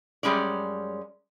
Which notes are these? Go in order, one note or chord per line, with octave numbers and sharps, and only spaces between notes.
F#2 G3 G#3 C#4 D5